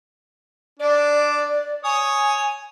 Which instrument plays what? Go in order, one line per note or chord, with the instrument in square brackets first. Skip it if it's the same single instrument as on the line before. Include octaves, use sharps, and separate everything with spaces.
[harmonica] D4 [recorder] D5
[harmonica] C#5 D#6 [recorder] G#5